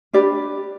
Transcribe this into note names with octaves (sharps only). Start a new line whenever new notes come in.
D4 G4 B4 D5